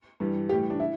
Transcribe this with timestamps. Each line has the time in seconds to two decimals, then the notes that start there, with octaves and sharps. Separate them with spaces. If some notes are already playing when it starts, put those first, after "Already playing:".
0.20 G2 E3 G3
0.49 A2 E3 G3 G4
0.70 D4
0.80 E4